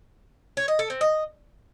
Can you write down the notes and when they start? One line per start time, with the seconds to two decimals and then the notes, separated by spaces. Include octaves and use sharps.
0.57 C#5
0.68 D#5
0.79 A4
0.90 C4
1.01 D#5